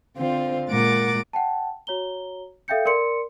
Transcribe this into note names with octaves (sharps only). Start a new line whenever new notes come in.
D3 C4 F4 C5
A#2 G#3 A#4 F#5 D6 A6
F#5 G5 A5
F#4 C#5 A#5 G7
A4 E5 F5 G5 G6 C#7
A#4 D5 C6 C#7